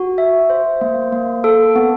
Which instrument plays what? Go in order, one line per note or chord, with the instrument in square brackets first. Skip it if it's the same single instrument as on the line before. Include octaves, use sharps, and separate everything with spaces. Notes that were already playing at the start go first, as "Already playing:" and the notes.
Already playing: [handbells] F#4
E5
C5
A#3
A#3
A4
B3